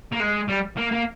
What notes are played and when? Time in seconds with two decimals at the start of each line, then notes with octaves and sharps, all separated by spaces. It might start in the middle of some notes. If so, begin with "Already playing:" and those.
0.13 A#3
0.21 G#3
0.49 G3
0.78 A#3
0.92 A#3